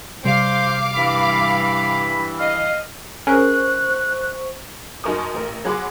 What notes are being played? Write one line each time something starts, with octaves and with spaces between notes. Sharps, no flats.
C3 G3 C5 F5 D6
G2 E3 B5
D#5 F5
C#4 G#4 A#4 C5 C#6 F#6
F#2 D#4 A#4 A5 C#6 D#6
A1 A#4
F#3 G#4 F#5 B5 C6 D6